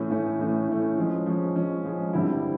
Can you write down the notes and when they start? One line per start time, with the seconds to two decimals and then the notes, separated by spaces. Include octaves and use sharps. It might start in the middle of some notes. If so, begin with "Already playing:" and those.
Already playing: A2 E3 A3 C#4
0.11 A2 E3 A3 C#4
0.39 A2 E3 A3 C#4
0.68 A2 E3 A3 C#4
0.97 F3 G#3 C#4
1.26 F3 G#3 C#4
1.56 F3 G#3 C#4
1.84 F3 G#3 C#4
2.13 G2 D3 G3 C4 E4